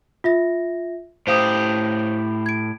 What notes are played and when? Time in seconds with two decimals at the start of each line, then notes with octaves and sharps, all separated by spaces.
0.24 F4 E5 A#6
1.27 A2 G4 C5 F5 D#6
2.46 G#6 D7